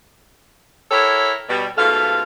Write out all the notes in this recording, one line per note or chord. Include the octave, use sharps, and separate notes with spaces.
E4 G4 A4 A#4 C#5
B2 G3
G#2 B2 A3 F4 A4 F5